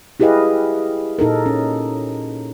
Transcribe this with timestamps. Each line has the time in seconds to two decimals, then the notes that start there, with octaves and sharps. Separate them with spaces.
0.20 E4 G4 G#4 B4 D#5 F5
1.19 A#2 D#4 A4 A#4
1.46 C#4